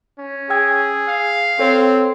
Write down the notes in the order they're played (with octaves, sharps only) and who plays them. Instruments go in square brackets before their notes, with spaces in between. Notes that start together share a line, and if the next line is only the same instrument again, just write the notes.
[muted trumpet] C#4
[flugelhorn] G#4 [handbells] G5 E6 G#6
[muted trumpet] F5
[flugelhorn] C4 [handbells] A4 C#5